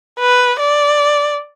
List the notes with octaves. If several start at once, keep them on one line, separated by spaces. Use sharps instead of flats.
B4
D5